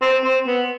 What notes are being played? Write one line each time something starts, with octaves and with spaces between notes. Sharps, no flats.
C4
C4
B3